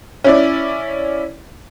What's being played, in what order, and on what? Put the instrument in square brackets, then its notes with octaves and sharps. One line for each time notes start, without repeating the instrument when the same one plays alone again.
[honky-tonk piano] C#4 E4 D5